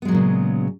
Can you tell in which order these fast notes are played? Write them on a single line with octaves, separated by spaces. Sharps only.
B3 G#3 F#3 A#2 C#3